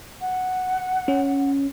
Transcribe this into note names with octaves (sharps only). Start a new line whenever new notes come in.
F#5
C#4